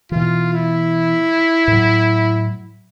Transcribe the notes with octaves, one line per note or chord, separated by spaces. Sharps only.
B2 E3 F4
E4
A2 F#3